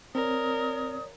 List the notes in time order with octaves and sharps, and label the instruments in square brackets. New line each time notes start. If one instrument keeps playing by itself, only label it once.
[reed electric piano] C4 [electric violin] A#4 [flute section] C#5 D5 D#6